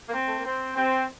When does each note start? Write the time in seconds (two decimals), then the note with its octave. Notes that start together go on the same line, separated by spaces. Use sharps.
0.09 A#3
0.14 C4
0.26 A3
0.36 A#3
0.45 C4
0.77 C4